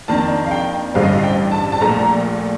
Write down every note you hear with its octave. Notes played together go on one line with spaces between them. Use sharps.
F2 D#3 A#3 D4 A5
F5
G5
A1 G2 D3 G3 C4 F5
D#5
F5
G5
A5
A5
A#1 A#2 A3 A#5